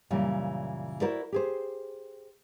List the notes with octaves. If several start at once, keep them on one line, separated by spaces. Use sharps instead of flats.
F#2 A#2 C#3 E3 G3
E4 F#4 A#4 C5 D5
G4 G#4 C5